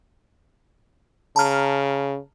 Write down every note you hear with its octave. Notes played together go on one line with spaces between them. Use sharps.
C#3 A5 A#5 F6